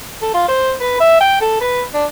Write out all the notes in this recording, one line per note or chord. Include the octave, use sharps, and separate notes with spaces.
A4
F4
C5
B4
E5
G5
A4
B4
D4